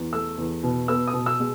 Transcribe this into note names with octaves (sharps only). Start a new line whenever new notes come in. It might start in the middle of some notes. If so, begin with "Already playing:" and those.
Already playing: E2
A3 E6
E2
B2
B3 E6
D#6
B2
E6
G#3